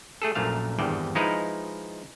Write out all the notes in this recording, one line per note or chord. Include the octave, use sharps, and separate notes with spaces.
A3 G#4 A4
A#1 F#2 A#2 A3 F5
G#1 E2 G2 D5 G5
F3 G#3 D#4 E4 B4 F5